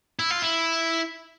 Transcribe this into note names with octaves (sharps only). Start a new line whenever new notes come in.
E4
F4
E4